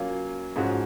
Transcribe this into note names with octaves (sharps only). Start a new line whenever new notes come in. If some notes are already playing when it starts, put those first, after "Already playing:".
Already playing: F#3 A#3 C#4 F4
G#2 F3 G#3 C#4 F#4